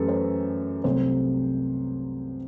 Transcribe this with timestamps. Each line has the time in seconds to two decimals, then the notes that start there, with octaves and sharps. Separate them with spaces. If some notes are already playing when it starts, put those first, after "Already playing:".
Already playing: F#2 E3 A3 G4 A4 B4
0.09 C5
0.84 C2 C3 F#3 A3 C5